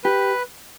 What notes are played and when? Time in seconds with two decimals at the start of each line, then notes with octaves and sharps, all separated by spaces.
0.04 G4 B4